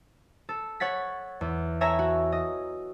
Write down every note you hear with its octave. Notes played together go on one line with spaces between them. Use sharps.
A4
C#5 F#5 A6 B6
E2
A4 C#5 E5 G#5 A#5
F#4
D#5